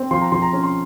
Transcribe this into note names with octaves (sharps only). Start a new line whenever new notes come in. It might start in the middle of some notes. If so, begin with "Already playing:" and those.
Already playing: C4
F3 C6
A#5
F3 C6
A#5
C#4
C6